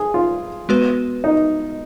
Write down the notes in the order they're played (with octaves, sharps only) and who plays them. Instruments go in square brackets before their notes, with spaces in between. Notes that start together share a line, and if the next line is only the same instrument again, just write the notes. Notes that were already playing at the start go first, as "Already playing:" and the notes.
Already playing: [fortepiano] G#4
F4
[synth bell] G#3 B3 F#4 B4
[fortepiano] D#4